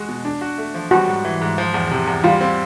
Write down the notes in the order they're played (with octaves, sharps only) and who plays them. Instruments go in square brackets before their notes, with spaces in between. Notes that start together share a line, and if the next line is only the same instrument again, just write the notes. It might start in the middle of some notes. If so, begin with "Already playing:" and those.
Already playing: [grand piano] G#3 F#4
B2
D4
F#4
A3
F3
[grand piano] G3 [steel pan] F#4
[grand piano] G#2
E3
G#2
F3
E2
C3
E2
[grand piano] G3 [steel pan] F4
[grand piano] C4